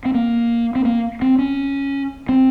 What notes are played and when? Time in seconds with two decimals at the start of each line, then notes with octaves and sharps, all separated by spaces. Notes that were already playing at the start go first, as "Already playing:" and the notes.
0.05 C4
0.14 A#3
0.75 C4
0.85 A#3
1.22 C4
1.39 C#4
2.29 C4